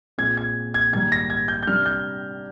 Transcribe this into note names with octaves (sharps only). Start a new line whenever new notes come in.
A#2 G#3 C4 G#6
G#6
G#6
G#2 D#3 G3 A#3 G#6
A#6
G#6
G6
G6
C3 G3 D4 F6
G6